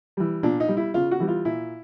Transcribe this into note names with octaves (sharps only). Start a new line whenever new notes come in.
E3 G3
A#2 D4
D#4
G3
E4
C#3 F4
F#4
E3 G3
F4
A#2 E4